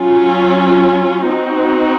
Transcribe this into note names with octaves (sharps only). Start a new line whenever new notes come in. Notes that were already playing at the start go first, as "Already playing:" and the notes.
Already playing: F#3 C#4 F4
C4 D#4 F#4